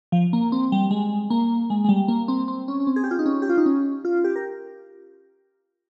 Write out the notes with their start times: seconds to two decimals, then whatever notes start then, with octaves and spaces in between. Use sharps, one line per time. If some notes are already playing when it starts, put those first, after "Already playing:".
0.12 F3
0.33 A#3
0.52 C4
0.72 G3
0.91 G#3
1.30 A#3
1.70 G#3
1.84 G#3
1.89 G3
2.08 A#3
2.28 C4
2.48 C4
2.68 C#4
2.80 C#4
2.87 C4
2.96 G#4
3.04 G4
3.11 F4
3.19 D#4
3.26 C#4
3.42 G4
3.49 F4
3.57 D#4
3.66 C#4
4.05 F4
4.24 G4
4.36 A#4